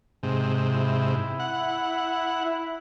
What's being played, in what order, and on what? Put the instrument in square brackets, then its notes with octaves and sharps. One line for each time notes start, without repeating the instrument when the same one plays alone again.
[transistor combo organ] G#2 C3
[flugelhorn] E4
[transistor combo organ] F#5
[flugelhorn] E4